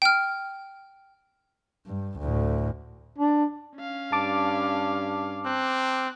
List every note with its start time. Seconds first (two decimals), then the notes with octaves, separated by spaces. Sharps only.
0.02 G5 F6
1.86 G2
2.19 D2 A2
3.19 D4
3.77 C#4 F5
4.12 G2 A5 D6
5.46 C4 F#6